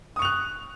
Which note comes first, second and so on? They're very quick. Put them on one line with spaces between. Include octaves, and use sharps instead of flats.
D#6 C#6 F7 F#6